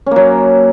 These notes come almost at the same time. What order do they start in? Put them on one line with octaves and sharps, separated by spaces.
C#4 A#3 F#3